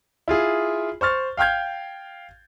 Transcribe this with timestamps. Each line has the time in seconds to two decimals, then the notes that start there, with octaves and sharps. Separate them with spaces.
0.28 E4 F4 G#4
1.01 C5 C#6 F6 A6
1.37 F5 G5 F6 G6 G#6